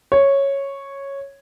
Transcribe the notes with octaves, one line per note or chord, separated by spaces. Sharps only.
C#5